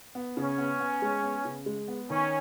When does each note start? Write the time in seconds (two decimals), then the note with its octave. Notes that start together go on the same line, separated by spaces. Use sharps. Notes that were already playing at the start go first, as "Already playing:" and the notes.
0.15 B3
0.37 C#3 C#4
0.58 B3
0.80 B3
1.02 G#3
1.23 B3
1.45 C#3
1.66 G#3
1.88 B3
2.10 D#3 C#4